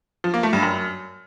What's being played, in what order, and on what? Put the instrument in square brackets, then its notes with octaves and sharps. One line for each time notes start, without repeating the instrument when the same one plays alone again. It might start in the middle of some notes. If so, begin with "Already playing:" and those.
[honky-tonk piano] F3
A#3
A3
G2
F#2